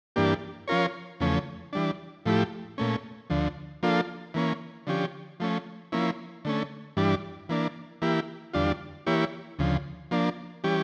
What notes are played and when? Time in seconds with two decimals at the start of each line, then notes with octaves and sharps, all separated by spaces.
0.16 G2 E3 A#3 D4 G4
0.68 F3 C#4 F4 A#4 C#5
1.20 E2 C#3 F3 A3 C#4
1.73 E3 G3 D4
2.26 A2 F3 A3 E4 G4
2.78 A#2 A3 C#4
3.30 D2 D3 F3
3.83 F3 A#3 D4 F4 A4
4.34 E3 A#3 C#4
4.87 D3 F3 C#4 G4
5.40 F3 A3 C#4
5.92 F3 A#3 C#4 E4
6.45 D3 A3 C#4
6.97 G2 E3 G3 D4
7.49 E3 A#3 D4
8.02 E3 A#3 E4 G4
8.53 E2 D3 G3 D4 F4
9.07 E3 A#3 E4 G4 C#5
9.59 D2 C#3 F3
10.11 F3 A#3 D4
10.64 E3 G3 C#4 G4